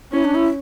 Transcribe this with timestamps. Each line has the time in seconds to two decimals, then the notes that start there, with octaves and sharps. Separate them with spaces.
0.13 C#4 E4
0.25 D4
0.35 E4